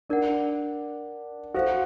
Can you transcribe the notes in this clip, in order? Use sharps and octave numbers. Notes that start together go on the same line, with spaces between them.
D4 A#4 D5 F#5
F#4 A4 C5 F5